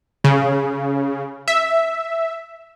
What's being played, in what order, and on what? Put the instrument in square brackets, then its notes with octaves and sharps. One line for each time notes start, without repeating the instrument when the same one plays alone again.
[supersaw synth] C#3
E5